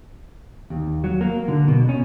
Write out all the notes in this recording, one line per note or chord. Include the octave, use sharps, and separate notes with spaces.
D#2
F#3
A#3
D3
B2
C#4